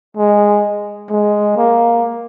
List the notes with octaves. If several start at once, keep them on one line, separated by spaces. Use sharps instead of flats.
G#3
G#3
A#3